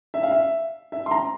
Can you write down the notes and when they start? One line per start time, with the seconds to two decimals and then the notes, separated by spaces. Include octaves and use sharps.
0.14 E5
0.23 F5
0.32 E5
0.92 E5
1.06 C6
1.11 A#5